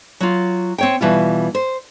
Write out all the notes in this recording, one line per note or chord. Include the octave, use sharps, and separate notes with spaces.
F#3 F4
C4 C#5 G5
B2 E3 G3 F4
C5